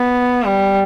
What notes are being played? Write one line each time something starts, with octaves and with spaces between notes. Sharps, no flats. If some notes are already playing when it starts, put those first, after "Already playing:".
Already playing: B3
G3